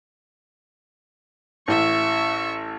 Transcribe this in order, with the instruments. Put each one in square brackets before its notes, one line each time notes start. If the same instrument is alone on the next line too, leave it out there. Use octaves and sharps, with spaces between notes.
[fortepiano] A1 A2 [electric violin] E5 C#6